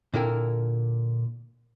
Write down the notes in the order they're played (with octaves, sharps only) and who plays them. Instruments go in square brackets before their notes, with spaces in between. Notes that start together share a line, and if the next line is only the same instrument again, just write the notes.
[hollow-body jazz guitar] A#2 D3 E4 A#4 G5